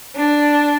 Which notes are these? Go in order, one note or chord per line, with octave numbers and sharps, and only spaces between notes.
D4